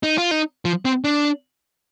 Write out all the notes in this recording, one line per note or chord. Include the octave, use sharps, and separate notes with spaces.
D#4
F4
D#4
F3
C4
D4